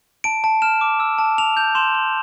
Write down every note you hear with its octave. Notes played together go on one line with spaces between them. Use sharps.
A5 D7
A5
F6 E7
D6
E6
A5
A5 F7
G6 F7
C6 E7
C6